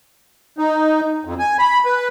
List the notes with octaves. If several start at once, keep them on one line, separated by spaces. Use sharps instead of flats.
D#4
F2
G#5
B5
B4